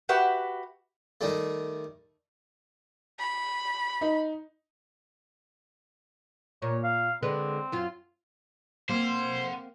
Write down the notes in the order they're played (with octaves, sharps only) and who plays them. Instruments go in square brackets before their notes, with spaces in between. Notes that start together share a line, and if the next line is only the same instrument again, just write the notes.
[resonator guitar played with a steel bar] F#4 G4 B4 E5 F#5
[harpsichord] D#3 G3 A3
[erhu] B5
[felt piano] D#4
[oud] A#2 [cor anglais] C#5
[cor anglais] F5
[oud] D3 G#3 B4 [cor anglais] C4
[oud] F#2 F4
[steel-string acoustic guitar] A#3 C4 [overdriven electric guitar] C5 [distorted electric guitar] F#5 C6